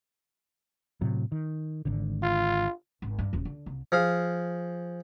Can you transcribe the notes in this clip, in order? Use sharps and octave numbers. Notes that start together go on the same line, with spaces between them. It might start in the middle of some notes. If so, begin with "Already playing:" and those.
A2 C3 F#3
D#3
G#1 D3
F4
G#1
G2
D#1 E2
D3
C2
F3 G#4 F5